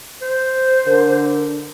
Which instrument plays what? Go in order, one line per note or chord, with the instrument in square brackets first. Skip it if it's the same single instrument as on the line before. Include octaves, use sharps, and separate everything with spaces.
[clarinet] C5
[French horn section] D3 A#4